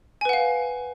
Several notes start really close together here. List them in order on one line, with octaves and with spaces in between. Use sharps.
G#5 B4 F#5 F5